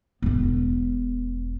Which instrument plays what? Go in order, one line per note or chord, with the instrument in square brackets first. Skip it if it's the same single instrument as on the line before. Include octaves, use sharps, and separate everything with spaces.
[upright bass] E1 B3